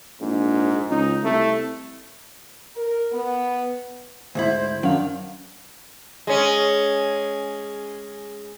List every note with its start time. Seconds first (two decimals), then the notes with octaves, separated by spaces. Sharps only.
0.21 A#1 G#2
0.90 C#2 D#4
1.24 C2 A3
2.76 A#4
3.13 B3
4.35 D2 G#2 E4 C5
4.83 F#2 D#3 F#3 D4 F5
6.27 G#3 C#4